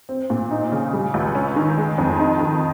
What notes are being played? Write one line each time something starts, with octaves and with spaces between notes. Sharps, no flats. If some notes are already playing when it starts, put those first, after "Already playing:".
C4
A#2
D#4
C#3
G3
C#2
C#4
D#3
G#3
F2
D#4
D#3